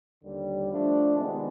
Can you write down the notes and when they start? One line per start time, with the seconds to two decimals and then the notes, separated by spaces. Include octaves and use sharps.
0.24 D#2 D3 G3
0.70 F3 A3 D4
1.15 C3 D#3 G#3 B3